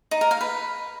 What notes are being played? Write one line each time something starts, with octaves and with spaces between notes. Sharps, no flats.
D#4
A#4
F5
B4